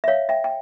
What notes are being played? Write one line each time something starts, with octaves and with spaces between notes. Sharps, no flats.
E5
C#5 F5
E5 G5
G5